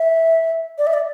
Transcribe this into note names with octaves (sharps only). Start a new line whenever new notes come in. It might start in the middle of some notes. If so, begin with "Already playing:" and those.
Already playing: E5
D5
E5
D5